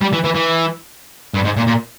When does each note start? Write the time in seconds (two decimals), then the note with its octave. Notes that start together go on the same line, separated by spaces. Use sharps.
0.01 G3
0.13 E3
0.24 E3
0.35 E3
1.34 G2
1.45 G#2
1.57 A#2
1.67 A#2